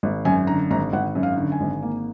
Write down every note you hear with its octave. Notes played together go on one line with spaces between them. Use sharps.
G#1
F#2 G#5
D3 A#5
G#1 A#5
G#1 F#5
F#2
F5
D3
G#5
G#1
A#3